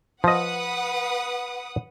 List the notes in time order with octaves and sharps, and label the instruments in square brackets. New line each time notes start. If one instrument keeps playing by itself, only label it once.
[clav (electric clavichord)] F3 D#5 [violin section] B4 F#5 D#6